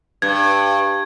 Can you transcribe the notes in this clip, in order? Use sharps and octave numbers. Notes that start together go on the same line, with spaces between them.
G2 G#6